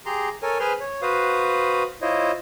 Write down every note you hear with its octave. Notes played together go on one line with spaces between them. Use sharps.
G4 G#4 A#5 C6
A4 A#4 C#5 G#5
G#4 B4 C5 G#5 C6 F6
C#5
F#4 B4 C5 F5 D#6
E4 F4 C5 C#5 D#5